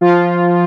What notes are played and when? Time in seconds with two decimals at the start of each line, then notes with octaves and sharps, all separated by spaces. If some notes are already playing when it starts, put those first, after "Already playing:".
0.01 F3 F4